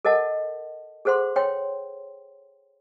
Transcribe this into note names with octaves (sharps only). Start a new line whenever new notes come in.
A4 A#4 D#5 F#5 A5
G#4 A4 C5 F#5 C6
C#5 G5 C6